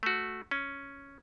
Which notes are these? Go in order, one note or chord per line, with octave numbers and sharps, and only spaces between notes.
A3 F#4
C#4